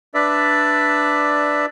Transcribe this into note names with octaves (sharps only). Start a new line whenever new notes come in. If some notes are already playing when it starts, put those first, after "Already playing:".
D4 B4 D5 E5